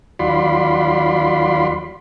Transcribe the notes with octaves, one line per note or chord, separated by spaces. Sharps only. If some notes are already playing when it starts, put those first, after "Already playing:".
D#2 F#3 F4 D5 B5 C6